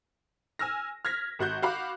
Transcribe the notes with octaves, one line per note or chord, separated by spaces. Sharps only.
G#5 E6 F6 A#6
F6 G#6 A#6 B6
G#1 F#4 F#6 G6
F#4 F5 B5 D6